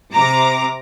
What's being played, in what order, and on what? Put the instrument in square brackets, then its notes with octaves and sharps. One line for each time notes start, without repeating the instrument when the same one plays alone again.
[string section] C3 A#5 D6